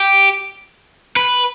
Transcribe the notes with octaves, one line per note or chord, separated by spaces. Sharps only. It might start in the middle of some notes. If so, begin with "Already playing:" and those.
Already playing: G4
B4